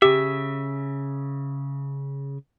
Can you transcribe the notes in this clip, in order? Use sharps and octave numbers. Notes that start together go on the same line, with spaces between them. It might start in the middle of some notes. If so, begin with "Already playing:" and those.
C#3 G4 E5